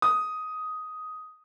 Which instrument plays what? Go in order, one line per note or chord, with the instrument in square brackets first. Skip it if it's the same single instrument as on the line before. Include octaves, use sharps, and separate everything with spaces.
[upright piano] D#6